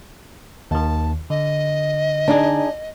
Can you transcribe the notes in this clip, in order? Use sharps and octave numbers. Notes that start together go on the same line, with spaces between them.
D#2 D#3 A5
D3 D#5
D4 D#4 G#4